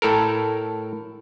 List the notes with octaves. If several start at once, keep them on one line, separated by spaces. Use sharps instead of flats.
A2 A4 A#4